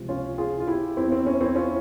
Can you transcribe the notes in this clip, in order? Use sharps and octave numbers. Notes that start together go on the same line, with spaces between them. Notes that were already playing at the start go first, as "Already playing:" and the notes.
Already playing: C#2 C3 F3
C#4 F4
F4 G#4
F4
E4 G4
E2 E3 C4 E4
C4
C#4
C4 E4
C#4 F4